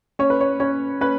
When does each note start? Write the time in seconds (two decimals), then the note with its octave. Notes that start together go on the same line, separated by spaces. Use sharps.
0.19 C#4 C#5
0.30 B4
0.41 C#5
0.60 C#4 C#5
1.01 C#4 B4